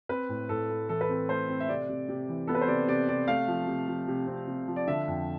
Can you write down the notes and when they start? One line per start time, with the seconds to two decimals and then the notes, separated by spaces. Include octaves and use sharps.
0.09 C4 B4
0.29 A2
0.49 A2 A4
0.70 A3
0.89 E3 A4
1.01 B4
1.09 C4 A4
1.29 A3 C5
1.49 C4
1.60 E5
1.69 C3 D5
1.89 C3
2.09 C3
2.29 E3
2.47 B3 A4
2.55 B4
2.61 C5
2.68 C3 D5
2.88 C3 D5
3.08 C3 D5
3.28 A3 F5
3.48 F3
3.68 C3
3.88 F3
4.08 C3
4.27 C4
4.48 C3
4.68 F3
4.76 D5
4.88 D3 E5
5.08 F2